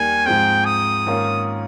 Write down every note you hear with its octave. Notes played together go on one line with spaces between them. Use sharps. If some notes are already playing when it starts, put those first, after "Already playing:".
Already playing: D#2 D#3 G3 G#5
G#2 F3 G#3 C4 G5
D#6
G#2 D#3 A#3 C#4 F4